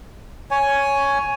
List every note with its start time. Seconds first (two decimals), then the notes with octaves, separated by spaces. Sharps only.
0.51 C#5 G#5